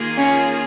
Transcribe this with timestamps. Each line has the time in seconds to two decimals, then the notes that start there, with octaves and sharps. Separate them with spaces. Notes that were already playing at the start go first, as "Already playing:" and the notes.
Already playing: D#3 A#3 F4 G#4
0.18 C#4